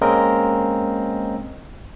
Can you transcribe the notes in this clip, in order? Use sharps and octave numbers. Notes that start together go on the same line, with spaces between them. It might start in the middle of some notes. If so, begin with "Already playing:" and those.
G#3 A#3 C4 C#4 A#4 D#5